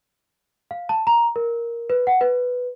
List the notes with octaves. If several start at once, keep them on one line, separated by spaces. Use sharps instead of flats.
F5
A5
A#5
A#4
B4
F#5
B4